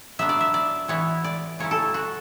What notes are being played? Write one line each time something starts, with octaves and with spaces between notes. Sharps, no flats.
F#3 B3 D4 E5
D5
E5
D5
E3 B3 E4 C#5
D5
C#3 F#3 C#4 E4 C#5
A4
F#4